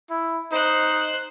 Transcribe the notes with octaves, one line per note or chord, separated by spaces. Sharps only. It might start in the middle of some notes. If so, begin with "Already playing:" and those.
E4
D#4 C5 F#6